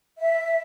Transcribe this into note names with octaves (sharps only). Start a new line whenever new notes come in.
E5